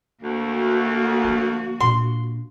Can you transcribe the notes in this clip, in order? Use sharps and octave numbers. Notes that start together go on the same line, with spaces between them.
D2 A#3 F#4
D3 F3
A#2 D4 C6